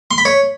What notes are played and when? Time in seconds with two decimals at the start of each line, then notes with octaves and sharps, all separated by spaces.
0.11 C6
0.18 B5
0.25 C#5